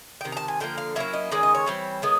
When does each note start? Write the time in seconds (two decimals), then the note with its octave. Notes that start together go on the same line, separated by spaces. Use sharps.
0.21 G5
0.25 C3 D#3
0.32 A#5
0.37 A5
0.48 G#5
0.60 D3 F3 A#3 G5
0.78 F5
0.96 F#3 A#3 C#4 E4 E5
1.13 D#5
1.31 D#3 G#3 C#4 D5
1.43 D#5
1.55 C#5
1.66 E3 G3 C4
2.02 D#3 G#3 B3